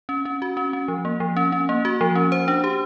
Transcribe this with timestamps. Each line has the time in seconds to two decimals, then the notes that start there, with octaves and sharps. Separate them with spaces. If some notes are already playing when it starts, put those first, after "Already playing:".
0.09 C#4
0.25 C#4
0.42 F#4
0.57 C#4
0.73 C#4
0.88 F3
1.05 A#3
1.20 F3
1.37 C#4
1.52 C#4
1.69 A#3
1.85 F#4
2.01 F3
2.15 C#4
2.32 C5
2.48 D4
2.64 G4